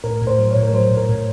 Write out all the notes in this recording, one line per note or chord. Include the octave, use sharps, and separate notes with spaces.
A2 A#4
A2
C5
F#3
A2 C#5
A#4
F#3 C5
A2
A#4
A2